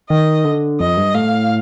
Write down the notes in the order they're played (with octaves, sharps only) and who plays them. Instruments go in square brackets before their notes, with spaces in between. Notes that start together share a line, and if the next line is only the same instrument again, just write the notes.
[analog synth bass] D#3 [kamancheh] D#5
[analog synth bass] D3
[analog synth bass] F2 [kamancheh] D#5
[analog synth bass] G2
[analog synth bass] A2 [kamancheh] F5